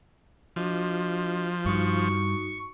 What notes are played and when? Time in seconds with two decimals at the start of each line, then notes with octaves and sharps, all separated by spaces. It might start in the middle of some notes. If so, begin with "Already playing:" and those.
0.56 F3 D4 F#4 D#5
1.66 G2 D#4 F#4 C#6